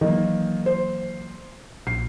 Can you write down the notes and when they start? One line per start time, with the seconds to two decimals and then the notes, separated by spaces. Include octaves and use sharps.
0.01 D#3 E3 F#3 A#3
0.66 C5
1.87 A#1 C7